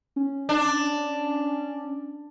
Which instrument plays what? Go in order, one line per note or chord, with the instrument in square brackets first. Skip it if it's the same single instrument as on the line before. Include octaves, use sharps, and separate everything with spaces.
[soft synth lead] C#4
[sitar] D4